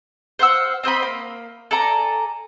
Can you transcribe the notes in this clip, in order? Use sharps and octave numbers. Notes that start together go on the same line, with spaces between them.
C5 F5 F#5 E6
C4 C5 D#5 B5
A#3
A4 D5 G#5 A#5